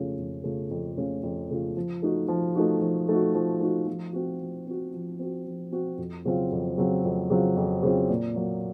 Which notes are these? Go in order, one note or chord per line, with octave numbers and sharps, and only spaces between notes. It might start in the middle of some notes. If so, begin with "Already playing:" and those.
Already playing: F2 C#3 A3 C#4 F4
F2
C#3 A3 C#4 F4
F2
C#3 A3 C#4 F4
F2
C#3 A3 C#4 F4
F3
A3 D#4 F#4
F3
A3 D#4 F#4
F3
A3 D#4 F#4
F3
A3 D#4 F#4
F3
C4 F#4
F3
C4 F#4
F3
C4 F#4
F3
C4 F#4
F2
C#3 F#3 C4 F4
F2
C#3 F#3 C4 F4
F2
C#3 F#3 C4 F4
F2
C#3 F#3 C4 F4
A#2
F#3 A#3